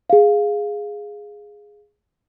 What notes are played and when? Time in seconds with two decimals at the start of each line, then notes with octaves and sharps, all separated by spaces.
0.10 G#4 F5